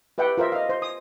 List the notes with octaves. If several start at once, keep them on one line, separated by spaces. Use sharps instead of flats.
G4 B4 E5 F#5 G5
F4 A#4 C5 E5
D#5 F5
C5
D#6